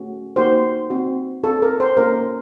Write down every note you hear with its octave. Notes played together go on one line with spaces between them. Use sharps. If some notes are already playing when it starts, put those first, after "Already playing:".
Already playing: A3 C#4 F#4
A#3 D#4 F#4 C5
C4 F#4
C4 F4 A4
A#4
C5
A#3 C#4 F4 A#4